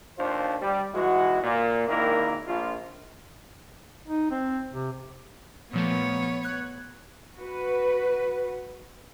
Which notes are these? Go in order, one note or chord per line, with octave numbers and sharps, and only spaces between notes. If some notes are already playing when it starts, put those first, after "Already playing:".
D#2 D4 F4 C5
G3
B1 E3 G#3 F#4
A#2
G#1 D#3 A#3 D4 E4 A#4
A#1 F4
D#4
C4
C3
A#2 F3 A3 B3 C#5
F#6 G#6
F#4 B4